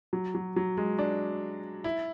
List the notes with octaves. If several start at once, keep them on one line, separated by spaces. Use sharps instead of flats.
F#3
F#3
F#3
G#3
D4
E4